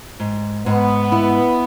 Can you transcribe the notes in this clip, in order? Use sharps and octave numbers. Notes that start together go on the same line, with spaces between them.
G#2
G#2 B3
E4